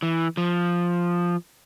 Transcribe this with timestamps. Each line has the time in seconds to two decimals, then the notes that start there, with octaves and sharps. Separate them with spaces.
0.02 E3
0.37 F3